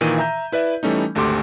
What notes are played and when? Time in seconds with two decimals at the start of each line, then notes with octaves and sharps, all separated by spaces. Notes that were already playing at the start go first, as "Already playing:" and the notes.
0.01 A#2 D#3 E3 D#7
0.18 E5 A#5 G6
0.52 E4 B4 D5 E5
0.83 E3 G3 A3 C#4 D#4
1.15 G#1 D2 A3 G4 C6 D6